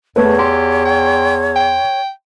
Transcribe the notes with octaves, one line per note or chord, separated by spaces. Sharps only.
E2 A3 B4 C#5
G4 C6
G5
G5